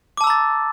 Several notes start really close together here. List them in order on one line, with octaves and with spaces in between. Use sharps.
D6 A5 E6 A#5 A6